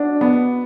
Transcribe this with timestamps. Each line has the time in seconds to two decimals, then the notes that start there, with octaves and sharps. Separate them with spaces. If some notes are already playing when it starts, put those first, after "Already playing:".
Already playing: B2 D4
0.21 B3